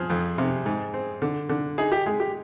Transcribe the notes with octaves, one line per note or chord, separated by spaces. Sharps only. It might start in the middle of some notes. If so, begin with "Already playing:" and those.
Already playing: F3 G#4
F2
C3
G#2
C4
D3
D3
D#4 G#4
G4
G#3 G#4
G4